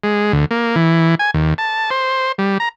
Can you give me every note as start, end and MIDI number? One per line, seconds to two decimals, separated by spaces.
0.04 0.32 56
0.33 0.45 38
0.51 0.76 58
0.76 1.15 52
1.19 1.31 80
1.34 1.54 39
1.58 1.90 81
1.91 2.32 72
2.38 2.58 55
2.60 2.69 82